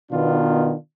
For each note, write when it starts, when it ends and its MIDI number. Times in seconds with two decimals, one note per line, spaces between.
0.12 0.75 47
0.12 0.75 51
0.12 0.75 59
0.12 0.75 62
0.12 0.75 65